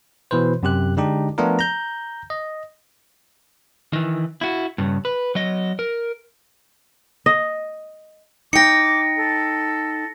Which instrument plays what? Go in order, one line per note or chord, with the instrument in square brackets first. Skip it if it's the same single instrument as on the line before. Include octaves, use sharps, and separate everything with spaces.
[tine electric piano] B2 E3 B4 C5
F#2 C3 G4 F#6
D3 G#3 D4 D#4 G4
F3 A3 B3 D4 F4 A#4
A#5 G6
D#5
[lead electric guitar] D#3 E3
E4 F#4
G2 C#3
B4
F#3 D#5
A#4
[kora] D#5
[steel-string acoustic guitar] D#4 G5 [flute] D6 [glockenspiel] A#6 C#7
[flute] A4